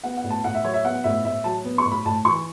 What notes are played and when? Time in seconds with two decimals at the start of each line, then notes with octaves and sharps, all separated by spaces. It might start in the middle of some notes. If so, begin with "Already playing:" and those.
0.04 B3 F#5
0.17 F#5
0.24 A2
0.30 A5
0.44 A2 F#5
0.55 E5
0.64 F#3 C#5
0.74 E5
0.84 B3 F#5
1.04 A2 E5
1.24 A2 E5
1.44 F#3 A5
1.64 B3
1.78 C#6
1.85 A2
1.92 B5
2.06 A2 A5
2.25 E3 C#6